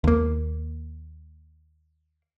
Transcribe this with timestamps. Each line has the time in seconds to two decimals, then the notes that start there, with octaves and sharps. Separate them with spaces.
0.04 D#2 A#3